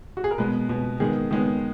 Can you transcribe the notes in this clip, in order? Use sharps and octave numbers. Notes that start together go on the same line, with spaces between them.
F#4
G#4
A#4
B2 G#3 B3 B4
B2 G#3 B3
D#3 G#3 B3 G#4
D#3 G#3 B3